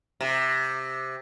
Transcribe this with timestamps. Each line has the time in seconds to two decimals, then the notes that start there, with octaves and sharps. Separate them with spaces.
0.21 C3